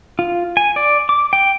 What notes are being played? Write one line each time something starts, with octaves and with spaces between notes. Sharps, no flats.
F4
G#5
D5
D6
G5